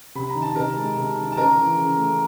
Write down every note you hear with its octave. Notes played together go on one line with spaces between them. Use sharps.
C3 B5
A#5
D#3
A5
C3 A#4 A#5
G#3
C3
D#3
A5
C#3 A#4 A#5
E3
C#3
A3